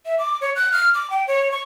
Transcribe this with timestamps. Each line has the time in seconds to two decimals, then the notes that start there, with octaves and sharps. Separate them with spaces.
0.06 E5
0.19 D6
0.41 C#5
0.56 F#6
0.72 F6
0.94 D6
1.10 G5
1.27 C#5
1.52 C#6